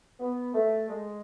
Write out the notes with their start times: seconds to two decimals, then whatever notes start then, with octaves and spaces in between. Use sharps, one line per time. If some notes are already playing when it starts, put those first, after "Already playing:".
0.19 B3
0.54 A3
0.89 G#3